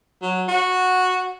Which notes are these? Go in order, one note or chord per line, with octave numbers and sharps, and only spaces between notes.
F#3
F#4